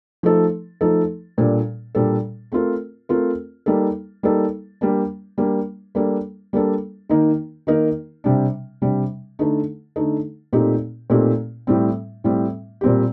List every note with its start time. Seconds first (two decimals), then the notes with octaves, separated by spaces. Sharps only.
0.23 F3 A3 D#4 A4
0.81 F3 A3 D#4 A4
1.37 A#2 G3 D4 A4
1.95 A#2 G3 D4 A4
2.52 A3 C4 F4 A#4
3.09 A3 C4 F4 A#4
3.66 G3 A#3 D#4 A4
4.23 G3 A#3 D#4 A4
4.81 G3 A#3 D4
5.38 G3 A#3 D4
5.95 G3 A#3 D4 A4
6.53 G3 A#3 D4 A4
7.09 D#3 A#3 D#4 A#4
7.67 D#3 A#3 D#4 A#4
8.24 C3 G3 D4
8.82 C3 G3 D4
9.39 D3 A3 D#4 A4
9.96 D3 A3 D#4 A4
10.53 A#2 A3 C4 D#4 G4
11.10 A#2 A3 C4 D#4 G4
11.67 A2 G3 C4
12.24 A2 G3 C4
12.81 A#2 G3 C4 G4